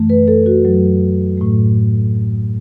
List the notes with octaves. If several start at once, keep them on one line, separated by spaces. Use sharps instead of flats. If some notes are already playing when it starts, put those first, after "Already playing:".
Already playing: F#2 E3 A3
B4
A4
F#4
F#2 F#3 A3
A2 A3